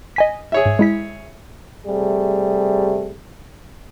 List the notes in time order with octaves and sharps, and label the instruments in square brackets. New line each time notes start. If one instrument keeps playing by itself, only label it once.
[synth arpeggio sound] D#5 G#5 B6
[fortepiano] G#4 C#5 E5
[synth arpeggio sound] G#2
G#3 E4 B6
[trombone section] C3 G3 A3 G#4